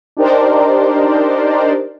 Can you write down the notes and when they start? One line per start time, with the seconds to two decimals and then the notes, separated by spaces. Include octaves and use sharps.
0.17 D4 D#4 G4 A#4 C5 D5